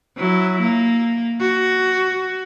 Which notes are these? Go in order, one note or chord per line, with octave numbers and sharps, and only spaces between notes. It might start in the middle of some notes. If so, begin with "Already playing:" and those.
F#3 E4
A#3
F#4